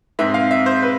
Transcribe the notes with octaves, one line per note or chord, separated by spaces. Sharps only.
G#2 G#3 C4 E5
F5
E5
C5
B4